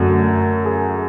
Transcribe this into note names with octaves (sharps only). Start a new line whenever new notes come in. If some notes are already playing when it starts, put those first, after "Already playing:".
Already playing: F#2 D3 F#3 A3 F#4
G#4